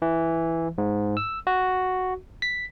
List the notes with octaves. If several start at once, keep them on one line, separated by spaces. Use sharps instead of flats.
E3
G#2
E6
F#4
B6